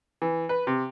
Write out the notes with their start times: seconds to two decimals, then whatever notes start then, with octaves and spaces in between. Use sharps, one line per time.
0.22 E3
0.49 B4
0.67 C3